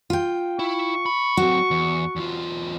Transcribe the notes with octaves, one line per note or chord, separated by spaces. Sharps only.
F4 G5
E4 C#6
B5
F#3 C4 F#4
E2
E2 F4